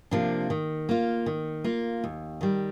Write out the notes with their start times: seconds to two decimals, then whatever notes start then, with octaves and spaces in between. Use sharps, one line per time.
0.11 C3 F3 A#3 D4
0.50 D#3
0.89 A#3 F4
1.26 D#3
1.64 A#3 F4
2.04 D#2
2.41 D#3 G3